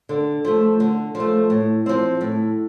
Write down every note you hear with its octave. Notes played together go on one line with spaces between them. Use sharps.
D3
F3 A3
D3
F3
A3
A2
F3 C4
A2